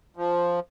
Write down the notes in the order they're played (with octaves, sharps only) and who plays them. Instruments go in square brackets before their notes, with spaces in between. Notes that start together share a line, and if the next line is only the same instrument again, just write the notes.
[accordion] F3